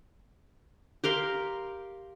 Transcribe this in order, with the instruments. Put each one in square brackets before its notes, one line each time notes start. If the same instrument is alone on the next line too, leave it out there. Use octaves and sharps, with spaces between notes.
[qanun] G4 A#4 F5 C6